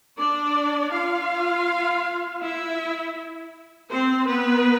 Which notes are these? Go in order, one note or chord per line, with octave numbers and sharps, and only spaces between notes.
D4 D5
F4 F5
E4 E5
C4 C5
B3 B4